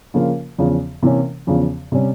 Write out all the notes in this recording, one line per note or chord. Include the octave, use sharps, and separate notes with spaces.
C#3 F3 A#3 F4
E2 C#3 F3
C3 E3 A#3 C#4
E2 C#3 F3
C3 G3 C#4